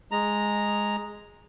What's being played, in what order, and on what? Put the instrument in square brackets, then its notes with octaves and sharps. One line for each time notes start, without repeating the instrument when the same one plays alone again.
[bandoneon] G#3 A#5